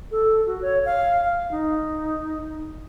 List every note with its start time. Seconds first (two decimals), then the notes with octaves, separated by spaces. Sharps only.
0.11 A4
0.46 F#4
0.62 C#5
0.85 F5
1.25 F5
1.51 D#4